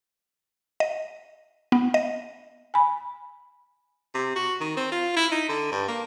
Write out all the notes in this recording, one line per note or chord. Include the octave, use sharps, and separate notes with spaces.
D#5
B3
D#5
G#5 B5
C3
F#4
D#3
C4
F4
E4
D#4
D3
G2
A#3